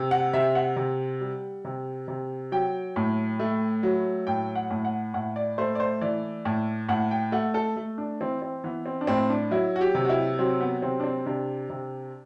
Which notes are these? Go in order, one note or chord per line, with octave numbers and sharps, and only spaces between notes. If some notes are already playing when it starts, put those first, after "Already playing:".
Already playing: C3
F#5
C3 E5
F#5
C3
G3
C3
C3
F#3 G5
A2
A3
F#3
A2 G5
F#5
A2
F#5
A2 F#5
D5
A3 C5
D5
C5
E3 D5
A2
A2 F#5
G5
A3 F#5
A4
A3
D4
E3 C4
C4
E3 B3
C4
D4
A2 C4
D4
F#3 E4
F#4
G4
C3
F#4
E4
F#3 C4
B3
C3 C4
D4
C4
C3 D4
C3